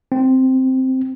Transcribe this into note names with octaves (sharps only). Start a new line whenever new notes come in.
C4